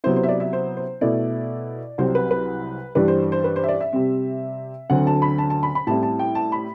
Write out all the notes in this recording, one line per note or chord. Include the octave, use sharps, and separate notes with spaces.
C3 F#3 B3 E4 C5
C5
E5
D5
E5
C5
C5
B2 A3 E4 D5
C2 C3 F#3 C4 C5
B4
B4
G2 E3 G3 D4 B4
C5
C5
B4
C5
E5
D5
E5
C3 G3 C4
D2 D3 F#3 A3 C4 F#5
A5
B5
A5
A5
B5
B5
A2 G3 C4 E4 A5
A5
G5
A5
B5